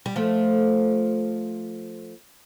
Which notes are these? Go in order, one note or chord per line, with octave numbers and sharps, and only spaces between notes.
G3
F3 A3